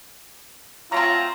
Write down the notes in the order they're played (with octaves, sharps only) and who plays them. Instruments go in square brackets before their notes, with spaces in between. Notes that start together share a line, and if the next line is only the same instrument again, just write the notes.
[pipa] F#3 A3 C4 [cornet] F4 [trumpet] A#5